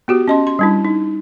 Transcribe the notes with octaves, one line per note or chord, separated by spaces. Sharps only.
B3 F#4 G4
C#4 D#5 C6
C6
G3 D4 E4
D#4